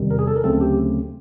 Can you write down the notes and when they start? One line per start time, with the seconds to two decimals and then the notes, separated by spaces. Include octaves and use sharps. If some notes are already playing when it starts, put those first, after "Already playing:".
Already playing: E2 C3 D#3 G3
0.11 A#4
0.19 G#4
0.28 A4
0.36 A#4
0.44 D2 C#3 F#3 A3 C4 A4
0.61 G4